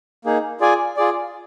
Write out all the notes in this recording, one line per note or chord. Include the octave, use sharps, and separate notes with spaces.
A#3 D#4 G#4
F4 G#4 D5 G#5
F4 G#4 D5